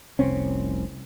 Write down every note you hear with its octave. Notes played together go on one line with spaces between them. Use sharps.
F1 C2 C4 C#4